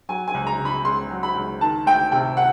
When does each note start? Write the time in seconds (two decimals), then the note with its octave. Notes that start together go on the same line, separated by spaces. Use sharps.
0.09 F#3 G#5
0.28 G#5
0.34 C#2
0.47 A#5
0.59 C#3
0.65 B5
0.85 C#2 C6
1.11 F#3
1.23 B5
1.36 C#2
1.61 D#3 A5
1.86 D2 G5
2.12 C3 G5
2.37 F#5